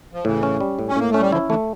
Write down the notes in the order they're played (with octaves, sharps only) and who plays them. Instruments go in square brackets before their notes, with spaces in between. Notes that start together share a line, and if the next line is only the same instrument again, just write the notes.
[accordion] F3
[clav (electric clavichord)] A2 [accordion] C#3 E3
[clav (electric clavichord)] C#4
G3
A2
[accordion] C#4
[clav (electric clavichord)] A2 [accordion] A#3
[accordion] A3 [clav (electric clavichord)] C#4
[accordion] G3
[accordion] D3 F3 [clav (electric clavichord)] E4
[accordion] C#3 E3 [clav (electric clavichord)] A3